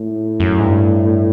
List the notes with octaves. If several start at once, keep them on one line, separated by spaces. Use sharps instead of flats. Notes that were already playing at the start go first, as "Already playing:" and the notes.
Already playing: A2
F#2
G#2
G2